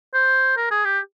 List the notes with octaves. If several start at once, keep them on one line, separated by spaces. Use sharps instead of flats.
C5
A#4
G#4
G4